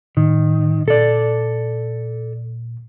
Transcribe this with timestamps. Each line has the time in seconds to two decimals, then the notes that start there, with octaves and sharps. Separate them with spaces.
0.17 A2 D#3
0.88 A#2 A4 D5